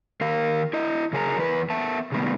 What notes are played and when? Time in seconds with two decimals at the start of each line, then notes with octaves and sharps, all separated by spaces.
0.21 D#3 A#4 F5
0.73 E4 D#5
1.13 C#3 F#3 G#4 A#4 A#5
1.38 E2 B4
1.70 B3 E5 A5
2.12 C3 D#3 G3 A3 B3